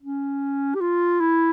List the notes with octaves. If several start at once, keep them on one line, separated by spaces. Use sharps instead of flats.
C#4
G4
F4
E4